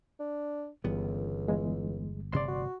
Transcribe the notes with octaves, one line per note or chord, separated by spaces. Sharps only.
D4
G1 C#2 E3 G3 B3
E2 G#3
A1 C3 D5 C6
F#4